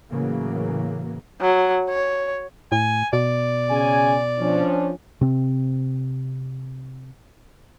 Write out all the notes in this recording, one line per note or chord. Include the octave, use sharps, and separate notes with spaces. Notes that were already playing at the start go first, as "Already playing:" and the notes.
A2 C#3 E3 F#3 A#3
F#3
C#5
A2 G#5
B2 D5
C#3 G#5
F3 C#4 D4
C3 C4